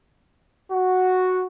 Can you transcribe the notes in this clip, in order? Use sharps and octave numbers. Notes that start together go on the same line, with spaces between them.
F#4